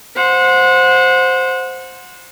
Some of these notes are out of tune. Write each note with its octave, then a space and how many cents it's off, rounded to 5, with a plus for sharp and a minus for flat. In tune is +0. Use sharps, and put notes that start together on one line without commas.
C5 +0 F#5 -25